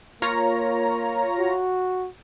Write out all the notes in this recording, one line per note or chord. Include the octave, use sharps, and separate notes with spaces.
A#3 F4 C#5 A#5
F#4